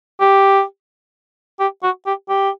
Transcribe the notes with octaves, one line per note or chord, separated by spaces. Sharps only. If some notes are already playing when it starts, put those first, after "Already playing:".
G4
G4
F#4
G4
G4